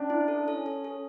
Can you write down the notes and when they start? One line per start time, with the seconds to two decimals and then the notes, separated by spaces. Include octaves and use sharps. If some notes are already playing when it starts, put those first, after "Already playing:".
Already playing: C#4 D4
0.10 E4
0.28 A4
0.48 C#4 A4
0.66 A4
0.84 A4